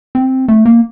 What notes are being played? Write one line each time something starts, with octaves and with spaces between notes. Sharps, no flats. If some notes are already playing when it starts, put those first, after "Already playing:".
C4
A3
A#3